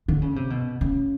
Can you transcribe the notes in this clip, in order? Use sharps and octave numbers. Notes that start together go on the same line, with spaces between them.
D3
C#3
C3
B2
C#3